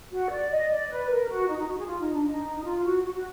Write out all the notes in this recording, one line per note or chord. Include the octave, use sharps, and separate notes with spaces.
F#4
D5
D#5
D5
B4
A#4
F#4
D#4
D#4
F#4
G#4
F4
D#4
D4
D#4
D#4
F4
F#4
F#4
F#4